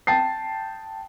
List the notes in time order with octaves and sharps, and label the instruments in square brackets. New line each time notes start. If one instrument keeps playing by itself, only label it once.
[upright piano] G5 A5 A6 C7